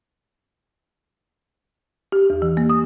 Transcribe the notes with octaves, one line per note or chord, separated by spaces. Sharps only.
G4
E2
E3
A#3
D#6